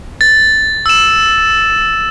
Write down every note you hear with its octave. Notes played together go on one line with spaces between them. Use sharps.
A6
E6 E7